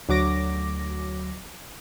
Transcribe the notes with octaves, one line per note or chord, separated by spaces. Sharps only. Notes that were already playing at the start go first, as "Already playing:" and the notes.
D2 F#3 D6 A#6